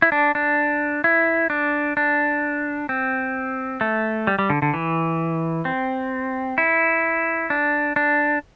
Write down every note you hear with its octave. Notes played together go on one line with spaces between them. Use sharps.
E4
D4
D4
E4
D4
D4
C4
A3
G3
G3
D3
D3
E3
C4
E4
D4
D4